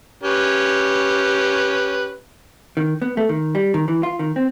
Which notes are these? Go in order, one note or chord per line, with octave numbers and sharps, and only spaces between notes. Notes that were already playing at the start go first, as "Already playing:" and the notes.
C#4 G4 B4
D#3
B3
A3
D#3
G3
D#3
E3
F4
D#3
C4